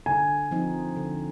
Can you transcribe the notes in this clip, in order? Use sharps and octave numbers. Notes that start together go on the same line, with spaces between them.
D3 G#5
F3 C4 D#4
D3